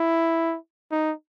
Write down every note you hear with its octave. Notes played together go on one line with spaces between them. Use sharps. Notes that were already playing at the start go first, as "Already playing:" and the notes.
Already playing: E4
D#4